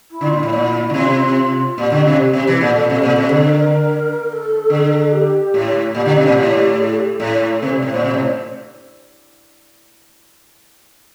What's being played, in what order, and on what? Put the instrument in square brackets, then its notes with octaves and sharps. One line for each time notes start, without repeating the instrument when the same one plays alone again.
[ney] E4
[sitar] D3
[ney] F4
[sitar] A#2
[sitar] A2 [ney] E4
[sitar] A#2
D3
[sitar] C3 [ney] F4
[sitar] A#2 [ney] G4
[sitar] D3
C3
C3
E3
[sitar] A#2 [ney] A4
[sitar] A#2
C3
A#2
C3
D3
[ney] A#4
A#4
A4
[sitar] D3
[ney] G4
[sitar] A2
[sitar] A#2 [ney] G4
[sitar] D3
C3
A#2
A2
[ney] A4
G4
A4
[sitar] A2
[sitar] C3 [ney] C5
[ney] D5
[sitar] A2
[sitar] A#2 [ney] C5
[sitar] C3
A2